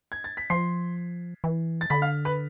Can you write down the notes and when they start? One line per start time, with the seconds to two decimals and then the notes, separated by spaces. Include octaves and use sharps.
0.12 G#6
0.24 A6
0.37 B6
0.50 F3 C6 C7
1.44 E3
1.81 A6
1.90 D3 B5 B6
2.02 F5 F6
2.25 B4 B5